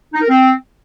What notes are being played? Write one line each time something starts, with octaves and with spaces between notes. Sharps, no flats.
D#4
A#4
C4